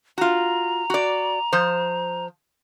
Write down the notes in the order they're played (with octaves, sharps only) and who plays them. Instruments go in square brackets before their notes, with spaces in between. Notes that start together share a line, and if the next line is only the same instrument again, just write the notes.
[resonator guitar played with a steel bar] F4 F#4 [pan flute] A#5
[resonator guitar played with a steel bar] F#4 D5
F3 C5